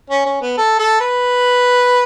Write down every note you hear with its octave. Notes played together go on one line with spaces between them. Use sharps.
C#4
C#4
B3
A4
A4
B4